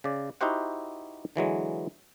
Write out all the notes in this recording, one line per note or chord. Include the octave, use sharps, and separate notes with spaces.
C#3 D5
D#4 E4 F#4 G4 C5 F#5
D3 E3 F#3 G#3